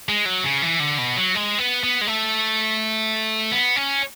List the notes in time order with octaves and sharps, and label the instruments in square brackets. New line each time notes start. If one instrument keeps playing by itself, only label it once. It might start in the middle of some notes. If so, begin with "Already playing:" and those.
[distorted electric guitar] G#3
F#3
C#3
E3
D3
B2
F#3
G#3
B3
B3
G#3
A3
B3
C#4